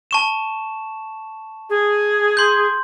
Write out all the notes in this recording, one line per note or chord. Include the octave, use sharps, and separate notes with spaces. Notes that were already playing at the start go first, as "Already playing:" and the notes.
A5 C#6 E7
G#4
C6 G6